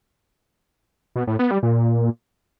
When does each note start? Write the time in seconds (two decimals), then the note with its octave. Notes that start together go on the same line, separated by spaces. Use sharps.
1.16 B2
1.27 A2
1.39 B3
1.51 G3
1.63 A#2